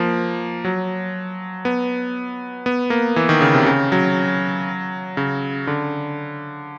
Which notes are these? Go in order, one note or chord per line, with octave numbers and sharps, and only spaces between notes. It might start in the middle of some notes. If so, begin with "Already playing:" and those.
Already playing: F3 A#3
F#3
B3
B3
A#3
E3
D#3
C#3
C3
C#3
F#3
C#3
D3